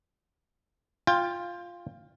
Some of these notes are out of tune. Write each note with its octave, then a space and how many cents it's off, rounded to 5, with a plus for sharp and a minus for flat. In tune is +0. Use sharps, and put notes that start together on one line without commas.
F4 +0 G5 +25